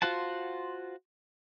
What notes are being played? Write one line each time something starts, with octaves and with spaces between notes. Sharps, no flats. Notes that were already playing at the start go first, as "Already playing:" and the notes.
F4 F#4 C5 F#5 A5